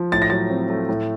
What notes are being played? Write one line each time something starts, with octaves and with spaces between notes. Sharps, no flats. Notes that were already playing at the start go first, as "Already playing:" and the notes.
Already playing: F3
A2 A6
A#6
F#3 A6
C4
A3
A2